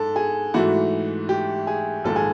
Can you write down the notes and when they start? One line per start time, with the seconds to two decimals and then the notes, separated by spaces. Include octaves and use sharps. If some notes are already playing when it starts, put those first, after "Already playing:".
Already playing: G#2 A4
0.16 G#4
0.54 G#2 E3 A3 F#4
1.29 G4
1.67 G#4
2.04 A#1 G#2 D#3 A4
2.16 G#4